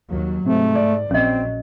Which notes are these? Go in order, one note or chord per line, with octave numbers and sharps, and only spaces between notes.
D#2 F#3
G#2 C3 A3
D5
A#1 F#3 C4 C#4 D#5